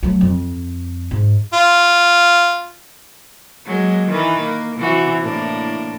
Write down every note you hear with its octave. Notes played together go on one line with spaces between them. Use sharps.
F#3 A3
F2
G#2
F4
F#3 G#3 A#3
D#3 E3 B4
A#3
C3 E3 F#4
A2 A#3 D4